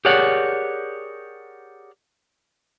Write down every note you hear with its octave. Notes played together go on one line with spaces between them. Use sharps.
G4 G#4 A#4 C#5 D5 F#5